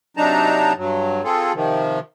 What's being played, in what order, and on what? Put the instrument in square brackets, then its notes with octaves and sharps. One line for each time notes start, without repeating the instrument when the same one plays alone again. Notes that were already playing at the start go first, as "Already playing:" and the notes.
[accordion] C3 F#3 D4 D#4 A5 A#5
G2 F#3
C4 F4 G#4 A4
C3 D#3 F3